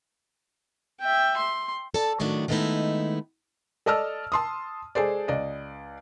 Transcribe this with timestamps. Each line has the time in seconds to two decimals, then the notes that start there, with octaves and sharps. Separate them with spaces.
1.00 E5 G5
1.37 C6
1.94 A4 D5 A5
2.20 A2 D#3 F#3 A3 D4
2.48 D#3 G#3 A3 B3 D#4 E4
3.86 A4 D5 D#5 A5 E6 F6
4.32 A5 C6 D#6
4.95 G#3 G#4 A4 C5 D5
5.28 C#2 D5 D#5